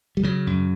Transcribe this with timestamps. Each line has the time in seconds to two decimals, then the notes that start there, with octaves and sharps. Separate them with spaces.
0.17 G3
0.23 C#3 F#3
0.47 F#2